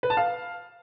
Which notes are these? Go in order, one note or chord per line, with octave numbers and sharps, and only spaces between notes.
B4
A5
F5